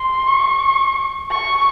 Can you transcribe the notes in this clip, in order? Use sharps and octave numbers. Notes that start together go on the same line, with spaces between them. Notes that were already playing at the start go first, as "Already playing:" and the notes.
Already playing: C6
C#6
C#6